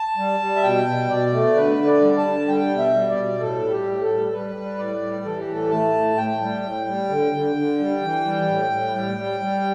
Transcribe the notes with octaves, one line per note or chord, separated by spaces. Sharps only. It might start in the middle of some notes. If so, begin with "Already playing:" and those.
Already playing: A5
G3
G3
E5
B2 G5
B2
B2 D5
A3
D3 B4
D3
D5
G3
A5
D3
G3 G5
B2
E5
G3
D5
B2
A2 A4
G3
G4
A2
A4
G3
G3 B4
G3
A2 D5
G3
E3 A4
G4
A2 A4
A3 A5
A2
A2 G5
G3
A2
G3
D3
D3
D3
G3
E3
G3
A2
A2
G3
G3
G3